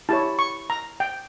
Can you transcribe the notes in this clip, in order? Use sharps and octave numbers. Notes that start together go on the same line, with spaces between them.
E4 G4 C#5 A5
C#6
A#5
G5